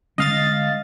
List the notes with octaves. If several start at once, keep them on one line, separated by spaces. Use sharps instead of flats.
D3 G#3 C#4 D#5 F5 A6